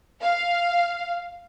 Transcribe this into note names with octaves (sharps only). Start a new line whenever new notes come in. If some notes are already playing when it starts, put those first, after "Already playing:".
F5